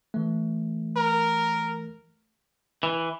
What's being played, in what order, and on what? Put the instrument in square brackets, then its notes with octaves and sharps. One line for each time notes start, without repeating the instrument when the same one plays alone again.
[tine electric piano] E3 A3
[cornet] A#4
[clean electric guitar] E3